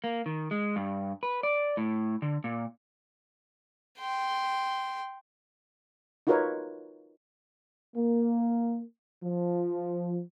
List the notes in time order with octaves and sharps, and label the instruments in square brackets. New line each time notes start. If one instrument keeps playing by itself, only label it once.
[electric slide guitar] A#3
D#3
G#3
G2
B4
D5
A2
D3
A#2
[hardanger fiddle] G5 C6
[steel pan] D#4 F4 F#4 A#4 B4 C#5
[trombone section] A#3
F3